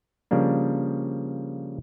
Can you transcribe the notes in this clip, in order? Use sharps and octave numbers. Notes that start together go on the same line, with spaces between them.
C#3 F3 G3 A#3 D4